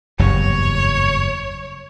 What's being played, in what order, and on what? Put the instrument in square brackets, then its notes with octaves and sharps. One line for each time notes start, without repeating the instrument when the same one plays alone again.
[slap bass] F#1 E2 G2 [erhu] C#5